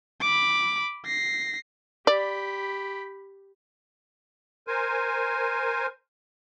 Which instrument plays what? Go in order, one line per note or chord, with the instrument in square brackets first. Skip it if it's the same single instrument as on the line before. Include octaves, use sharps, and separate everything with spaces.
[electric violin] B5 D6
A#6 C7
[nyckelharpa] G4 B5 [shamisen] D5
[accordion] A#4 C5 G#5